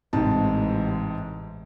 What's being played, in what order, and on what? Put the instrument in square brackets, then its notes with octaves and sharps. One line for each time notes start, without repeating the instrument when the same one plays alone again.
[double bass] A1 G#3 [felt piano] G#2 C3 A5